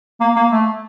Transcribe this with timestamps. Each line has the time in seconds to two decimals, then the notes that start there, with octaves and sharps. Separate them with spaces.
0.20 A#3
0.36 A#3
0.52 A3